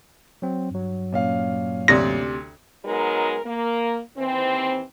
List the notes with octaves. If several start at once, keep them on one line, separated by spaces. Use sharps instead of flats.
F#3 C4
G2 F#3
A#2 C#4 F5
D2 C3 D5 A#6
F#3 G#3 B3 D#4 A#4
A#3
D#2 E3 C4